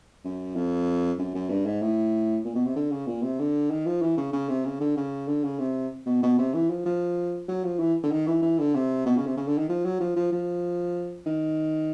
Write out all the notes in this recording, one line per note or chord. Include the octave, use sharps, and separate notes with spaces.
F#2
F2
F#2
F#2
G2
G#2
A2
A#2
B2
C3
D3
C#3
A#2
C3
D3
D#3
F3
E3
C#3
C#3
C3
C#3
D3
C#3
D3
C#3
C3
B2
B2
C3
E3
F3
F3
F#3
F3
E3
D3
D#3
E3
E3
D3
C3
B2
C#3
C3
C#3
D3
D#3
F3
F#3
F3
F3
F3
D#3